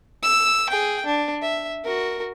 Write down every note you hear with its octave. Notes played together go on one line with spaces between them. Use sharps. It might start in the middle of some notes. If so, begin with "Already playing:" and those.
E6
G#4 G5
D4
E5
F#4 A#4